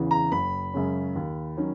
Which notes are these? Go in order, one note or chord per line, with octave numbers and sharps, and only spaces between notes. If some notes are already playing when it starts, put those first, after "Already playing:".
Already playing: E2 C#3 E3
A#5
F#1 B5
F#2 C#3 G#3 C#4
D#2
D#3 F#3 C#4